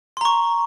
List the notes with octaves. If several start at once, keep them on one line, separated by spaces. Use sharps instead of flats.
A#5 C6 C#6